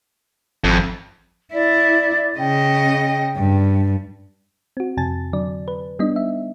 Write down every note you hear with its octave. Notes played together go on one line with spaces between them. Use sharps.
G#1 F2
E4 D5
C#3 D#5 G5
G2
C4 F#4
F2 C3 G#5 A5 A6
D3 F#3 D5
B4
G3 B3 D4 D#4 D#5
E5